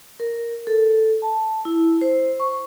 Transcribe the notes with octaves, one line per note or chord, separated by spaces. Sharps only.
A#4
A4
A5
E4
C5
C#6